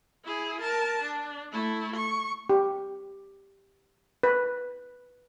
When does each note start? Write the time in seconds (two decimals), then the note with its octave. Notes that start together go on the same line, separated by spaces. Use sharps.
0.25 E4 G#4
0.61 A#4 A5
1.02 D4
1.53 A3 E4
1.96 C#6
2.50 G4
4.23 B4